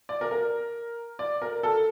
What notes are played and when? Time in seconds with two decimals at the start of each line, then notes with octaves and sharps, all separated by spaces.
0.09 D5
0.21 A#4
0.31 A#4
1.19 D5
1.42 A#4
1.63 A4